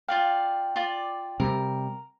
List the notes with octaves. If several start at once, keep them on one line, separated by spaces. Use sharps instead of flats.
F4 D5 F5 G5
F4 D5
C3 G3 A#4